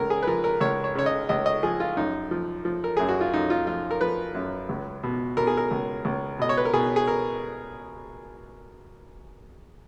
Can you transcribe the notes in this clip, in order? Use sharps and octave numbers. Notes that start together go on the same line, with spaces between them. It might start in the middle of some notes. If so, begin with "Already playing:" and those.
Already playing: C#2 C#3 A#4
G#4
B4
F3 A#4
A#4
C#2 C#5
C#5
C#3 C#5
D#5
C#2 D#5
D#5
F3 G#4
F4
F#2 D#4
F3
F3
A#4
F#2 G#4
F#4
F4
F#2 D#4
F4
F3 F4
A#4
F3 B4
F#2
C#2
B2
B2 A#4
G#4
A#4
C#2
C#2
B2 D#5
C#5
B4
A#4
B2 G#4
G#4
A#4